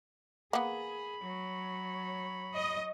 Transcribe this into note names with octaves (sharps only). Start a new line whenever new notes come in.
A#3 B3 G#4 B5
F#3 C#5
D#5